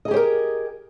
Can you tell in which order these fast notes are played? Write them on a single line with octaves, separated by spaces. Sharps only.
D#5 G#4 G4 C5 A#4